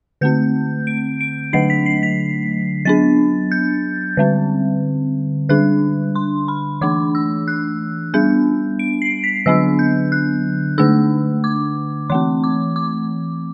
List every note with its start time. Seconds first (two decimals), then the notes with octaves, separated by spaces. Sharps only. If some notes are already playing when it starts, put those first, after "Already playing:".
0.21 D3 A3 C4 G6
0.87 D7
1.21 D7
1.53 D3 F#3 A3 D4 C7
1.70 B6
1.86 C7
2.03 B6
2.85 F#3 B3 D4 A6
3.52 G6
4.17 D3 G3 C4
5.49 D3 G3 D4 F#6
6.15 C6
6.48 B5
6.81 E3 A3 D4 D6
7.15 E6
7.48 F#6
8.14 G3 B3 D4 G6
8.79 D7
9.02 C7
9.24 B6
9.46 D3 F#3 B3 D4 E6
9.79 G6
10.12 F#6
10.78 D3 A3 D4 E6
11.44 D6
12.10 E3 A3 C4 C6
12.44 D6
12.76 D6